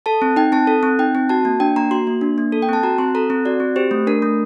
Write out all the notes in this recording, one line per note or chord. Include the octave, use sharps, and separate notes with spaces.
A4 A5
C4
D#4 G5
C4 A5
A4
C4
D#4 G5
C4
F#4 A5
A#3
D4 G5
A#3 A#5
F#4 C6
A#3
D4
A#3
A4
G5
C4 A5
F#4 A#5
C4 C6
A4 A#5
C4
F#4 D5
C4
G4 C5
A3
D4 A#4
A3